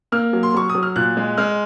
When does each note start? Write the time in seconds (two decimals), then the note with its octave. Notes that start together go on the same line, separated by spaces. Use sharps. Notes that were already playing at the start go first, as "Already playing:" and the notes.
0.12 A#3 F6
0.33 F#3
0.43 C6
0.54 F#3 C#6
0.69 D#6
0.75 F#3
0.83 F6
0.96 A#2 F#6
1.17 G#3
1.38 G#3 F6